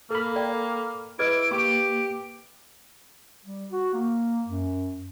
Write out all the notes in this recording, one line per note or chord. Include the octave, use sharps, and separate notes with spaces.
A#3 A4 B5
D5 G5
E4 G#4 B4 D#5 G#6 D7
A#3 G4 C#6
G3
F#4
A#3
F#2